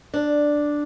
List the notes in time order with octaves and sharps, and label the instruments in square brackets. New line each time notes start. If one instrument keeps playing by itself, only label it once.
[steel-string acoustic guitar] D4